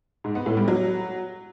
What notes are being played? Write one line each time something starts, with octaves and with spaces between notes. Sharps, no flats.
G#2
B3
A2
G3
F#3